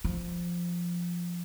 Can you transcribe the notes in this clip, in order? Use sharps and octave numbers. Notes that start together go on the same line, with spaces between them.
F3